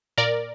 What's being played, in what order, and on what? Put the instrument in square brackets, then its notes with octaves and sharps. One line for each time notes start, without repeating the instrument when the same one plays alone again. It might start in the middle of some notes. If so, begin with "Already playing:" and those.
[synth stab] A#2 A#4 D5